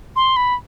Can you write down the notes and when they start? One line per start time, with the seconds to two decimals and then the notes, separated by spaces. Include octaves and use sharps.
0.16 C6
0.36 B5